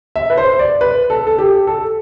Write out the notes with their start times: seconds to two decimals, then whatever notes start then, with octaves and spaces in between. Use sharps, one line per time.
0.16 E5
0.30 B4
0.37 C5
0.59 D5
0.81 B4
1.10 A4
1.27 A4
1.38 G4
1.67 A4